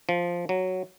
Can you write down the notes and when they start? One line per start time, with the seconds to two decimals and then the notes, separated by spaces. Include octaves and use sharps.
0.09 F3
0.49 F#3